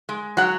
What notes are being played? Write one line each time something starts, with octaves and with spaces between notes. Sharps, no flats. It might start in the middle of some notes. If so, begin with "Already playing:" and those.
G#3
F#3 F#5